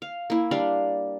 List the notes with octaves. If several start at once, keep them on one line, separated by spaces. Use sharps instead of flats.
F5
A#3 E4
G3 D4 D5 F5